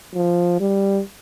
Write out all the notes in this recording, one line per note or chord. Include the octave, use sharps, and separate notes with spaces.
F3
G3